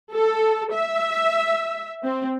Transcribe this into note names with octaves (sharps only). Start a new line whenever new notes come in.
A4
E5
C4